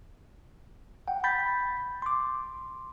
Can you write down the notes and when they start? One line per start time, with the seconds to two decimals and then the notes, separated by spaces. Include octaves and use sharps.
1.08 F#5 G5
1.24 B5 G6 A6 B6
2.02 C6 D6